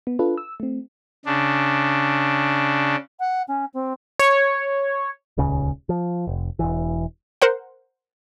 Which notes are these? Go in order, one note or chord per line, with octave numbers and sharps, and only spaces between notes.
B3
D4 F4 A4 B4
E6
A3 C4
C#3 D4
F#5
C#4
C4
C#5
D#1 C#2 C#3
F3
F1
E1 C#2 E3
A#4 C5 F#5